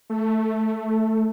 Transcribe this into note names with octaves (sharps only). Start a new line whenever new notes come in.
A3